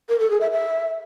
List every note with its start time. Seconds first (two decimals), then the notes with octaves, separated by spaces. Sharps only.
0.09 A#4
0.20 A4
0.30 G#4
0.41 E5
0.51 E5